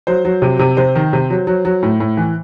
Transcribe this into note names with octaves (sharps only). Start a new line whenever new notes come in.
F#3 C5
F#3
C3
C3
C3 C5
D#3
C3
F#3
F#3
F#3
A2
A2
E3